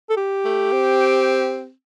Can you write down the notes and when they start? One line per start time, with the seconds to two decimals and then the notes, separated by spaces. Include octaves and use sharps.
0.10 A4
0.17 G4
0.45 A3
0.72 C4